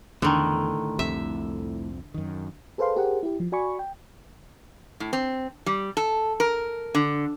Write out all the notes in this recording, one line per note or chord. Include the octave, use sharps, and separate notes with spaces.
E2 A2 D3 D#3 A4 A#5
C2 F2 C3 E5
F#2 D#3
G#4 A4 B4 C5 F5 C6
G4 G#4 A#4 C5 F#5
E4 G4
F3
F#4 D5 G#5 B5 C#6
G5
A2
C4
G3
A4
A#4
D3